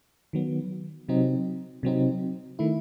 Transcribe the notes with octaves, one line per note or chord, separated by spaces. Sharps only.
D#3 F#3 B3
C3 F#3 C4 D#4
C3 F#3 C4 D#4
D#3 A3 E4